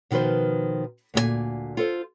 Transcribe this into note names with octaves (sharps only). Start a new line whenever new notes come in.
B2 D#3 F3 B4 C5
D2 A#2 F#4 G#5
F4 A4 C5